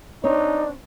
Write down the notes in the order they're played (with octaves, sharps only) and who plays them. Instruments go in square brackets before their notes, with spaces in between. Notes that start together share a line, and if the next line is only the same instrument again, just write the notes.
[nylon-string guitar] C4 C#5 [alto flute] D4 [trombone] D#4